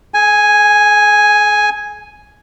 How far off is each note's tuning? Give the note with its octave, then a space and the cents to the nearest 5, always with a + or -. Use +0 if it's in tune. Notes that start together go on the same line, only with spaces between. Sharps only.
G#4 +35 G#5 +0